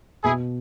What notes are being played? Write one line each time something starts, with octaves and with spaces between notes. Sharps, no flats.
B2 E4 G#4